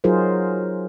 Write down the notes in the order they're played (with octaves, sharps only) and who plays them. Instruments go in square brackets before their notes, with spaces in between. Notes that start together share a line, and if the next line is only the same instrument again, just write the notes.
[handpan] F#3 D#4 F4 G#4 A#4 C5